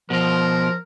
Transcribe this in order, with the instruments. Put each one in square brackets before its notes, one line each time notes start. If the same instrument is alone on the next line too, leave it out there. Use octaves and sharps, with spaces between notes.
[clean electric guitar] B2 F4 [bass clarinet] F3 [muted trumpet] A#4